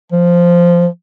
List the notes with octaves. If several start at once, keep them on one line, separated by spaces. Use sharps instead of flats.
F3